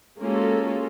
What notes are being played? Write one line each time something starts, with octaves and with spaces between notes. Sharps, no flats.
G#3 A#3 C#4 F4 F#4 A4